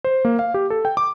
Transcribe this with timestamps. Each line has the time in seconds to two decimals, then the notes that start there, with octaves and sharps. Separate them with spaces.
0.05 C5
0.25 A#3
0.39 F5
0.54 G4
0.70 A4
0.85 G5
0.97 D6